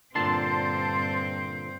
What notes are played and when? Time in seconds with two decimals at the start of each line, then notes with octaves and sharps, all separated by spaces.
0.15 G2 A#2 D3 C4 C5 A5 C6